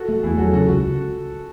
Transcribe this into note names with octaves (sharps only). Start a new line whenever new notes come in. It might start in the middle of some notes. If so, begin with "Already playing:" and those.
Already playing: F#4 A4
A3
E2 E4 G#4
F#3 F#4 A4
C#3 F#4 A4
C#2 F#4